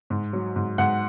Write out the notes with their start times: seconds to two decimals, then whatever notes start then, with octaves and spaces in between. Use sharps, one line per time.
0.10 G#2
0.33 F#3
0.56 G#2
0.78 G#2 F#5